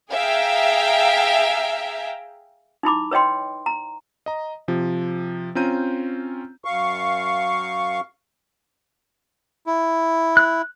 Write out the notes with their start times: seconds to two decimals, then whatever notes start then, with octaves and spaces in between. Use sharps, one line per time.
0.12 G#4 E5 F5 G5 A#5
2.83 D#4 E4 B5 D6
3.11 B4 C#5 D#5 G5 C6
3.66 A#5
4.26 D#5 A#5
4.68 C3 F3
5.55 C4 C#4 F4 A#5 G6 D#7
6.65 F#2 F5 C#6
9.66 E4
10.37 F#6